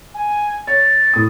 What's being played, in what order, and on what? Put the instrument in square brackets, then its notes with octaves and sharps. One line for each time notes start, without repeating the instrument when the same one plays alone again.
[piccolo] G#5
[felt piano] C#5 [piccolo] A6
[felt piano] A2 D#6